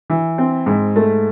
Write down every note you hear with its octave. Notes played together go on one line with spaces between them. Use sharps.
E3
C4
G#2
A3